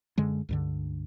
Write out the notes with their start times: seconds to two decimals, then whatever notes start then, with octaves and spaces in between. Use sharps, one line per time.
0.18 F#2 D3 G#3
0.49 C#2 G2 D3